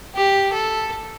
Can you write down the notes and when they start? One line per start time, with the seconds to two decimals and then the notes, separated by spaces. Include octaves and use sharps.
0.15 G4
0.52 A4